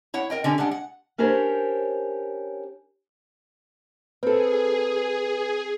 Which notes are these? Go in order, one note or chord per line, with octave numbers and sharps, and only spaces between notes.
E4 C#5 F#5
A#4 D#5 G5
D3 C#4 G4
G3 G#3 D4 F#5
F#5
C#4 D4 G4 A#4 C5 C#5
C4 G#4 A4 B4